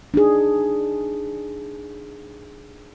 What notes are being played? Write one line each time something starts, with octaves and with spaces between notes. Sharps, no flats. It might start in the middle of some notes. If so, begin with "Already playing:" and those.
D4 D#4 G#4